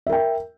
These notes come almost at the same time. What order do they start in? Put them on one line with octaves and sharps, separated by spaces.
E5 A#4 G5